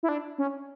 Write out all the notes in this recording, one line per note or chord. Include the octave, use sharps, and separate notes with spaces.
E4
D4
C#4